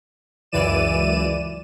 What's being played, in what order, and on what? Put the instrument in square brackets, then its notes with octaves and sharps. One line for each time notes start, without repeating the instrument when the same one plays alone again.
[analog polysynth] C#2 F#2 E3 D5 D#7 E7